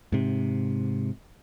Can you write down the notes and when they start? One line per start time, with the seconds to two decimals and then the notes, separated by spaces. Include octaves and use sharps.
0.12 G#2 C3